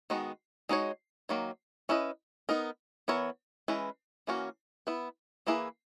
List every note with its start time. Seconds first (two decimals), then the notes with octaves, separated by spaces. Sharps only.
0.10 D#3 G#3 B3 F#4
0.69 G#3 D#4 F#4 C#5
1.29 D#3 F#3 A#3
1.89 C#4 E4 B4 D#5
2.49 B3 D#4 A#4
3.08 E3 B3 E4 A#4 C#5
3.68 E3 G#3 C#4 E4 B4
4.27 E3 A#3 C#4 F#4
4.87 B3 E4 B4
5.47 E3 A#3 E4 G#4 B4